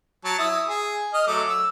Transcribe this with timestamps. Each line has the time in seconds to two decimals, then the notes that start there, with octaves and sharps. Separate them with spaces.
0.25 F#3 A5
0.39 E4 D#6 E6
0.68 G#4
1.14 D#5 D#6 F6
1.27 F#3 A3 D6
1.49 E6